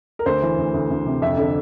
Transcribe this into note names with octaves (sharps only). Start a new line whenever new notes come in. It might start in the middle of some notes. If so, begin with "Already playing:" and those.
A#4
D2 C5
E3
D2
D2
D2
C3
F2 E5
D3